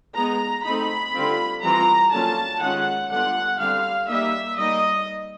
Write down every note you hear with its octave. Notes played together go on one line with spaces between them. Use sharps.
G#3 B3 D#4 A#5
A3 C4 D#4 B5
D3 G3 C4 F4
E3 G3 C4 F4 A#5
D3 F#3 A#3 C#4 F4 A5
D#3 G#3 C#4 F4 F#5
D3 G3 B3 D4 F4 F#5
D3 G3 C4 F5
G3 A#3 D#4 E5
G3 A#3 D#4 D#5